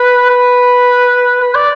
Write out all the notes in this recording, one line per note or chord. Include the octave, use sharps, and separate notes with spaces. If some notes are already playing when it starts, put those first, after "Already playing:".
Already playing: B4
B4
B4
D5